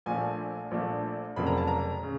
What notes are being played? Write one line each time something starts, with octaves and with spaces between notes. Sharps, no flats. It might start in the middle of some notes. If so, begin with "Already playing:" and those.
A#1 A#2 F3 A3 D4 G#5
A#1 A#2 F3 A3 D4
F1 F2 C#3 F#3 A#3 B5
A#5
A5
A#5
C#3